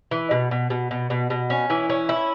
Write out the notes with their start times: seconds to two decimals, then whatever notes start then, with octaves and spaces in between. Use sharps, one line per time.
0.11 E3
0.31 B2
0.51 B2
0.70 B2
0.91 B2
1.10 B2
1.30 B2
1.50 C#4
1.70 E3
1.90 C#4
2.09 E4